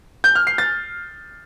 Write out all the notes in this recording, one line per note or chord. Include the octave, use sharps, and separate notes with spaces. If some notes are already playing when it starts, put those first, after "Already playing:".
G6
F6
C7
A6